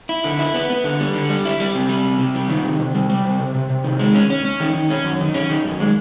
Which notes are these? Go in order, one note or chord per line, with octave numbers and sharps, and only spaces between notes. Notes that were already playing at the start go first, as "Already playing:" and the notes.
E4
D3
E4
B3
B3
D3
G3
D3
G3
E4
G3
C3
G3
C3
C3
G3
D#3
C3
C3
G3
G3
C3
C3
C3
C3
D#3
G#3
C#4
C#4
C#4
D#3
D#3
C#4
F#2
D#3
C#4
D#3
F#2
G#3